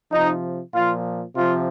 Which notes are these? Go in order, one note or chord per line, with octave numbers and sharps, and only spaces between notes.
C3 F3 D#4
A#2 F3 F4
C3 F3 F4